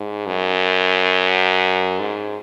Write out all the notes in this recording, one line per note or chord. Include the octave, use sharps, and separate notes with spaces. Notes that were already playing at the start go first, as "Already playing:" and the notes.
Already playing: G#2
F#2
G#2